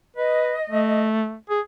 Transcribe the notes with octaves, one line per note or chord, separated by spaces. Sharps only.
B4 D#5
A3
G#4